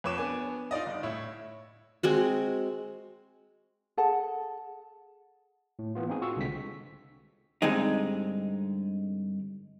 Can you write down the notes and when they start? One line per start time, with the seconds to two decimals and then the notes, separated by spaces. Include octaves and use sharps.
0.04 F2 B4 C#5 D6 E7
0.18 B3 D4 G#5
0.71 D#4 F4 D5 D#5
0.86 G1
1.03 A2 E4 C#5
2.03 G#3 C4 F#4
3.98 G#4 A4 F#5 A5
5.79 A2
5.95 E3 A#3 B3 F4
6.09 C4 D#4 G#4 G#5
6.21 F4 F#4 C#6 E6
6.36 C2 D3 G#3 C4 B6
7.62 G2 D3 G#3 C4 D#4